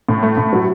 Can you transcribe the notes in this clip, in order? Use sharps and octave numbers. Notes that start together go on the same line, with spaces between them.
A2
A3
A2
F#3